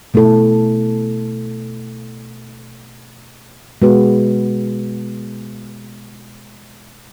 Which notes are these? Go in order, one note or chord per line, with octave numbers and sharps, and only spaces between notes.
B2 A3 E4 A4
B2 G#3 B3 F#4 B4